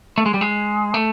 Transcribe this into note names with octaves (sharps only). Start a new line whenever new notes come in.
A3
G#3
G3
G#3
A3